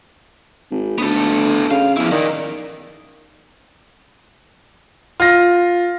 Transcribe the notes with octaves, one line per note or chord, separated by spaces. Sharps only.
G#1
D2 B3 A4
C#3 F5
E2 F3 E4
D#3 A#4 D5
F4 A#6